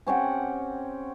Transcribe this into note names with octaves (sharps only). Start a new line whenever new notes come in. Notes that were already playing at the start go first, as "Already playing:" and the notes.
C4 C#4 G4 F#5